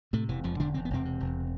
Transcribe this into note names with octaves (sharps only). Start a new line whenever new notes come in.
A2 C3 A3
E1 E3
E1 F2 F3
E1 D3 D4
E1 C4
B3
E1 C3 C4
C3
E1